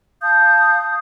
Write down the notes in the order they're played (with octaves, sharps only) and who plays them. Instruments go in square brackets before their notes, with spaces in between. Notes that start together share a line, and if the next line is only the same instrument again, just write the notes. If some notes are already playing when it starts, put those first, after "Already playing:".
[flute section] F5 A5 D#6 G6